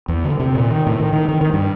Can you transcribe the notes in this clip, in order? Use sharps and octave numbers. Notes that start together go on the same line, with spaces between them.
E2
D3
C3
A#2
D#3
A2
D#3
D#3
D#3
D#3
G2